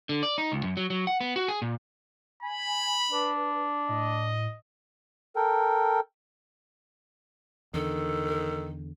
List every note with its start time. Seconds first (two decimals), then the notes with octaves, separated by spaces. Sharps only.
0.09 D3
0.23 D5
0.38 D#4
0.52 C#2
0.64 F#2
0.77 F#3
0.90 F#3
1.07 F#5
1.21 B3
1.36 F#4
1.48 G#4
1.62 A#2
2.42 G#5 B5
3.12 D4 B4
3.89 A2 D#5
5.36 A4 A#4 G5
7.74 E2 D3 D#3 A4